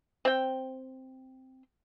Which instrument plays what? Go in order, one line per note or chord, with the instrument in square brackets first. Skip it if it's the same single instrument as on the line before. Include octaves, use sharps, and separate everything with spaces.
[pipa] C4 G5